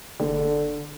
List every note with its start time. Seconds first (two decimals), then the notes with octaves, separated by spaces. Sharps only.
0.20 F#1 D3